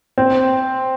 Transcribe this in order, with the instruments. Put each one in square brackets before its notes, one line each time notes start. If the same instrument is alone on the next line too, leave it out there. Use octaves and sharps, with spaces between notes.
[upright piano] C4